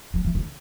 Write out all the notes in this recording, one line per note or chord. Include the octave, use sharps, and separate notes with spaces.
F#3
E3
D3